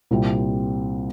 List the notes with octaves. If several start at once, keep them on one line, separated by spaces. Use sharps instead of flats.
C2 A#2 G3 C4